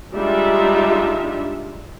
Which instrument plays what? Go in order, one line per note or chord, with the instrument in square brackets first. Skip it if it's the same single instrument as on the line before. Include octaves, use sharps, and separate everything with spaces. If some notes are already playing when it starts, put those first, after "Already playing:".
[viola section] G3 G#3 D4 D#4 F4 E5